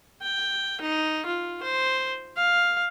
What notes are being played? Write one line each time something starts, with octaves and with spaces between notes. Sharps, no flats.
G5
D#4
F4
C5
F5